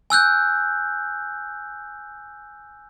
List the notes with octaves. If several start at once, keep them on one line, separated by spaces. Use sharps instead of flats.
G#5 E6 F#6 G6